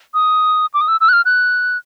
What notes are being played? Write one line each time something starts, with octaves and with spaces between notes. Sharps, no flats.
D#6
D6
D#6
E6
E6
F#6
F6
F#6